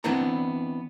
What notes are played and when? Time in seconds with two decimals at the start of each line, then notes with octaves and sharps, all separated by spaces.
0.04 E3 B3 C4 D4 E4 A#5